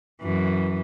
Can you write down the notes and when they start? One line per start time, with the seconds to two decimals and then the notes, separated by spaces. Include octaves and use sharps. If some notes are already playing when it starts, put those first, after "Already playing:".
0.22 F#2 E3